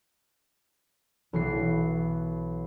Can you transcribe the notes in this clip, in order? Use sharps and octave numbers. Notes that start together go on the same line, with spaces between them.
B1 E3 C7